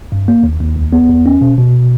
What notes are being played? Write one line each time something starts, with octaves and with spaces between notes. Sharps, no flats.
G2
A#3
D#2
D#2
C#2
B3
E2
C#4
B2
B2